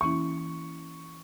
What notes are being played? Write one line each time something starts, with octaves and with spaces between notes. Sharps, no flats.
E3 A#3 C#4 E4 C#6